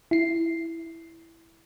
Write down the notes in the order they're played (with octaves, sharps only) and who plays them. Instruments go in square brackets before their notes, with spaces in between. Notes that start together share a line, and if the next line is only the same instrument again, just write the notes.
[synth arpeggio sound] E4 C7